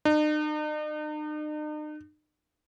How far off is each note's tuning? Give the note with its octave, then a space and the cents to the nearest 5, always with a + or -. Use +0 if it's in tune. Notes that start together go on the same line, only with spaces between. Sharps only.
D#4 -45